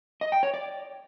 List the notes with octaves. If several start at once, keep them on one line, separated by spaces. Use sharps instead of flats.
D#5
G5
C#5
D5